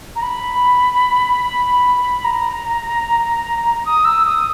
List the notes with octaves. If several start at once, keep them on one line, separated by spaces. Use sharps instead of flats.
A#5
B5
A#5
D#6
E6
D#6